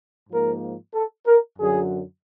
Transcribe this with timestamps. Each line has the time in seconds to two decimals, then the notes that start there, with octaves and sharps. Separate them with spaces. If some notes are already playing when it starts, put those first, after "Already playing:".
0.29 G#2 F3 A#3 A#4
0.94 A4
1.27 A#4
1.58 F#2 D3 F#3 G#4